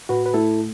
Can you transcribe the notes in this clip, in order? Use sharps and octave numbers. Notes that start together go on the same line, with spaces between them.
A2 F#4 B4
B4
A3 E4 A4